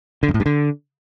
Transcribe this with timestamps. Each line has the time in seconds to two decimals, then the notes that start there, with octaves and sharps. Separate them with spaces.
0.23 D3
0.29 F#2
0.34 A2
0.40 G2
0.46 D3